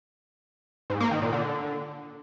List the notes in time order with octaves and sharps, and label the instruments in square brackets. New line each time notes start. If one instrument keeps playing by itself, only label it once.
[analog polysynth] G#2
A#3
D#3
A#2
D3